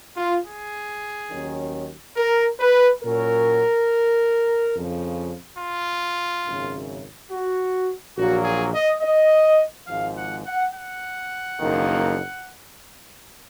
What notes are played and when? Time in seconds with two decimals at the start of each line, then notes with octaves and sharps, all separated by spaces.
0.16 F4
0.45 G#4
1.31 D#2 D#3 F#3 C#4
2.16 A#4
2.60 B4
3.02 A#2 F#3 C#4 A#4
4.74 F2 C#3 F3
5.59 F4
6.46 G#1 F#2 C#3
7.31 F#4
8.16 A#1 A#2 F#3 A#3 F#4
8.45 G#4
8.74 D#5
9.02 D#5
9.88 G#1 G#2 F3 F5
10.16 F#5
10.46 F#5
10.74 F#5
11.59 F#1 F2 D#3 A#3 D#4